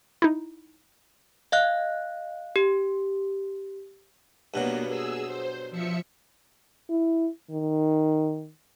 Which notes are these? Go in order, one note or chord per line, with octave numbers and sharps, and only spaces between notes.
D#4 E4
D#5 F5 F#6
G4
G2 B2 F#3 A#3 B3
G#4 E6
C5
F3 E5 C#7
E4
D#3